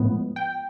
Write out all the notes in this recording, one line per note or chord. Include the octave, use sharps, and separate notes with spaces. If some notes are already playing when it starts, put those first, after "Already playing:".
Already playing: A2 F3 G#3 B3
G5